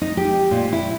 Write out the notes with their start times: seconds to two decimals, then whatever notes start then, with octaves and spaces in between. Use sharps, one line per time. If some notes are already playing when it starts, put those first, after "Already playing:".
0.01 D#4
0.17 G4
0.51 A#2
0.72 E4